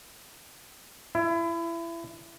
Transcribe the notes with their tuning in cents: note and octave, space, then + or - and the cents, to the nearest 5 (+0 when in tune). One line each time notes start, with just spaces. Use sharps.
E4 +25